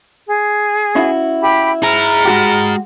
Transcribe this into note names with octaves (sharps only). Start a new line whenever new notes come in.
G#4
C#4 E4 F#4
G4 B5
G#4 A#5 B5 F6
G#3 F#4 G4